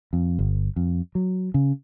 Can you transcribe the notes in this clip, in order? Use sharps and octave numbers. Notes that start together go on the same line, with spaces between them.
F2
G1
F2
F#3
C#3